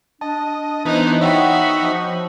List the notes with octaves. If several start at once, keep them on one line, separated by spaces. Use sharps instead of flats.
D4 D#5 A5
E3 B3 D#4 C5
D#4 F#4 C#5 E5 F#5 G5 B5
F3